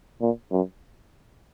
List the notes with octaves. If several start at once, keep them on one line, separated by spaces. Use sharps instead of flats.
A#2
F#2